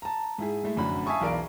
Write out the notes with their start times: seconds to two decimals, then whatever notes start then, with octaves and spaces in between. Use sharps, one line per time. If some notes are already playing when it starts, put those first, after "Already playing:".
0.02 A5 A#5
0.38 G#2 E4 G#4
0.63 G#3 A3 E4
0.76 F1 F#2 A2 D3 B5
1.06 E5 F5 G#5 A5 C#6 D#6
1.21 B1 E2 A#4 D5 F5 D7